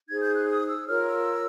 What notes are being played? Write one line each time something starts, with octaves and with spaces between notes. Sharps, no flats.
D#4 G#4 C5 G#6
G6
F#6
D#6
E6
F4 A#4 C#5 F6
E6